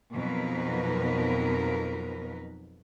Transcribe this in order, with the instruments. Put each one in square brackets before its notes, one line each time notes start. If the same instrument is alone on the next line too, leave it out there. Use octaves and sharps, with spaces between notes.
[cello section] F2 B2 F#3 D#4 A#4 B4